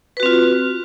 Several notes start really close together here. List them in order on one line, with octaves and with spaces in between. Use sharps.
B4 F#4 C4 F4